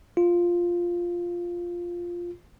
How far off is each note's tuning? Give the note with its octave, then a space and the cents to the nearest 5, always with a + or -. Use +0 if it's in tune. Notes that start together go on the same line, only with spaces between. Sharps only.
F4 +0